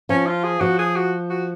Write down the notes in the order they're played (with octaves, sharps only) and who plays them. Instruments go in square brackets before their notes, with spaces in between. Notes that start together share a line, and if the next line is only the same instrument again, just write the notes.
[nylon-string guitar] F3 [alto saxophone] C#4
[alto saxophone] F4
G#4
[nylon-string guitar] F3 [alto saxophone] F#4
[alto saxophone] G#4
F#4
F#4